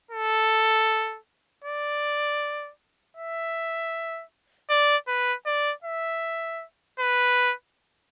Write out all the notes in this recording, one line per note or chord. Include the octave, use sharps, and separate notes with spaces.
A4
D5
E5
D5
B4
D5
E5
B4